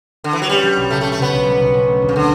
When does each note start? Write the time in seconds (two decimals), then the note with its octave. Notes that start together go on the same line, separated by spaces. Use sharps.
0.24 D3
0.33 E3
0.42 F#3
0.49 G3 C#4
0.63 F#3
0.77 B1
0.90 C#3 A3
1.01 A3
1.05 C#4
1.12 A3
1.19 C#3 B3
1.33 B1
1.46 G3
1.61 B1
1.74 C#4
1.87 A3
2.02 D2
2.09 C#3
2.16 D3